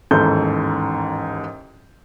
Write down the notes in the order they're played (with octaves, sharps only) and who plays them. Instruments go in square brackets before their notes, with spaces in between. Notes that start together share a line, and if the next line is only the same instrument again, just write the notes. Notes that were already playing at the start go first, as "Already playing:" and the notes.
[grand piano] A1 D#2 G#2 A4 G6